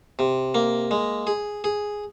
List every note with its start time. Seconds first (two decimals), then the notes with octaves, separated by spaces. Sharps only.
0.19 C3
0.55 A#3
0.91 G#3
1.27 G#4
1.64 G#4